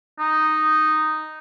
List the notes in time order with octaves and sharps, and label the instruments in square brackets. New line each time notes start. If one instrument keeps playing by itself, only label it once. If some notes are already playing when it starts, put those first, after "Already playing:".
[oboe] D#4